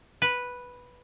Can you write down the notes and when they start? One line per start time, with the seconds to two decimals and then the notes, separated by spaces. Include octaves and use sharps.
0.22 B4